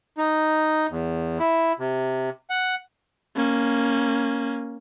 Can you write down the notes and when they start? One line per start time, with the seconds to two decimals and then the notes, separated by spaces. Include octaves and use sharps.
0.18 D#4
0.90 E2
1.39 E4
1.79 C3
2.50 F#5
3.36 A#3 C#4